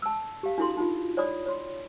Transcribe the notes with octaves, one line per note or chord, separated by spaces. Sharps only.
A5 E6
G4 F5
D4 E4 F#4 A4 C6
D#4 F4
C#5 D5 B5 D#6
C#5 C6